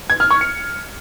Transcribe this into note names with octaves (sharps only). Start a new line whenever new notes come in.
G#6
F6
C#6
C#7